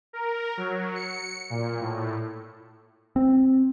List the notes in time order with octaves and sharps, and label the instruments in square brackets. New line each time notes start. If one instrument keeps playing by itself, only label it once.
[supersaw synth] A#4
F#3
C#7
A#2
A2
[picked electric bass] C4